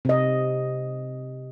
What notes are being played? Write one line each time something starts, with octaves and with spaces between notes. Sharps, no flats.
C3 D#5